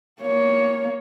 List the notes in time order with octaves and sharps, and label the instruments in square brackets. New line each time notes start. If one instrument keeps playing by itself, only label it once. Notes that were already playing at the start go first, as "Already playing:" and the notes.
[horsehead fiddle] A#3 C#5